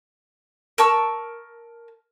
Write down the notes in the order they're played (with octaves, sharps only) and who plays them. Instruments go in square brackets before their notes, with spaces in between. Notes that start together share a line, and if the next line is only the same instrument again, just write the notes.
[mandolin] A#4 A5 C#6 E6